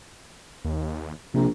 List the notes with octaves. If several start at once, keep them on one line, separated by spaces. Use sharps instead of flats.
D#2
A#1 C3